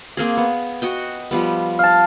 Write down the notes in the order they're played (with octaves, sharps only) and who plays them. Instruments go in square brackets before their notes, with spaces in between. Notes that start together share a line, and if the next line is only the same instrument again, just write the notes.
[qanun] A#3 C4 G#4
B3
F#4 D#5 G5
F3 G3 B3
[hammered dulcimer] F5 A5